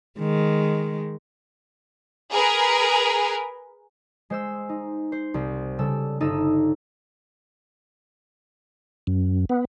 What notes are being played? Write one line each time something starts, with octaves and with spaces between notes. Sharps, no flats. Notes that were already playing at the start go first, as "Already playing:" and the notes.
D#3 G#3
G#4 A#4 B4
G#3 C5 E6
D#4
C5
C2
C#3 G3 A4 E6
G1 D#4 A4 D#6 E6
F#2
B3